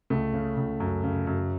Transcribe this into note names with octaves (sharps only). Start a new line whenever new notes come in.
C#2 A3
C#3
C#2
F#2
C#3
F#2